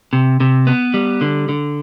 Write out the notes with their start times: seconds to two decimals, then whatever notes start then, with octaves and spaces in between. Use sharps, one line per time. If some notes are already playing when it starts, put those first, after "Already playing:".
0.13 C3
0.40 C3
0.67 B3
0.94 G3
1.21 D3
1.49 D3